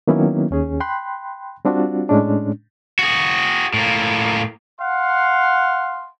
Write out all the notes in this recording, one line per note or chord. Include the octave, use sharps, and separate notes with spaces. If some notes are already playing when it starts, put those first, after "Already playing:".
D#3 F#3 A#3 B3 C#4 E4
D#2 C#4 G#4
G5 B5 C6 F#6
G3 C4 D4 F4 F#4
A2 G#3 C#4 D4
F#4 G#4
A2 A#3
F5 F#5 C6